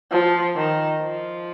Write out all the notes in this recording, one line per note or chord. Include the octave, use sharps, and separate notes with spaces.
F3
D#3
F3